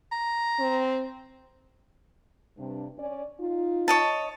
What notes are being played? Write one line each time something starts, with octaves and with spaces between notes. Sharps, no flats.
A#5
C4
G2 C3 D4
C#4 D5
D#4 F4
C#5 D#5 A5